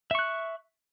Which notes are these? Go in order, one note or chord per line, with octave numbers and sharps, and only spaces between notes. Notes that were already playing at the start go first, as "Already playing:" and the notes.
E5 C#6 F#6